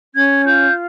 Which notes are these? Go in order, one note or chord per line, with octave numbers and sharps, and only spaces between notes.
C#4 G#6
F4 G6